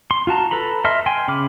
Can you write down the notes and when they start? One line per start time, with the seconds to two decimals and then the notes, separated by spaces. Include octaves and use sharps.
0.11 C6
0.27 F4 F#4 A5 A#5
0.51 A4 B4 A#5 B5
0.84 D#5 E5 A5 C6 F6
1.06 G5 G#5 C6
1.28 C#3 B5 D6 F6